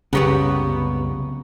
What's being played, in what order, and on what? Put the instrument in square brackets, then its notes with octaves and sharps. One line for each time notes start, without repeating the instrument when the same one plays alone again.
[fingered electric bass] C2 F#2 [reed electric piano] C#3 A#5 C#6 [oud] B3 G4 B4